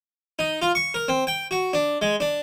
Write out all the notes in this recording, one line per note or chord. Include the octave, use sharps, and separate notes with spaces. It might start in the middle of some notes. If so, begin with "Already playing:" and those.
D#4
F4
C#6
A#4
C4
G5
F#4
D4
G#3
D4